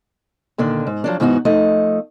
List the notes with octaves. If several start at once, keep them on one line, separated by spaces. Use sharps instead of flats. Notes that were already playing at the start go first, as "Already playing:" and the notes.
A#2 D3 D#3 D4
G#2
F3 F#3 D4
G#2 E3 B3 D#4 F4 F#4
F3 A3 D#4 D#5